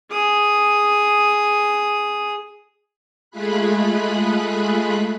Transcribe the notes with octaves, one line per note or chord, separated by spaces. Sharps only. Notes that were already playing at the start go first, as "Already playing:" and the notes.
G#4 D#6
G#3 A3 F4 G#4 B5 F#6